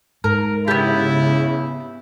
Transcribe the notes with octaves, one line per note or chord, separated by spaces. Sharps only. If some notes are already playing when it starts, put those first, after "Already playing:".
G#2 A#4
C#3 B3 E4 G4